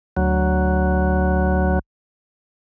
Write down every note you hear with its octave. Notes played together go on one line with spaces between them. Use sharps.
D2 F#3